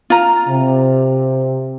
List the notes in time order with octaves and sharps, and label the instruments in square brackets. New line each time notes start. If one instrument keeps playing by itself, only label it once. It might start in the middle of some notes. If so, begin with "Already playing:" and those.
[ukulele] F4 A#5
[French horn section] C3